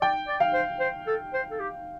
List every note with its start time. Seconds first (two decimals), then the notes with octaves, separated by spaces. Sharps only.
0.01 D5 G5
0.27 D5
0.40 F5
0.54 C5
0.80 C5
1.07 A4
1.33 C5
1.51 A4
1.59 G4